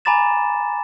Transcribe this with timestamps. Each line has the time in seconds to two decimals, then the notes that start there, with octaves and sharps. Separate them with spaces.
0.05 G#5 A#5 B5 D6 A6 E7